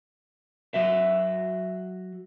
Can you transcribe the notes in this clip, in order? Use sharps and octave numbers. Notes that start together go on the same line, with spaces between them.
F#3 F#4 E5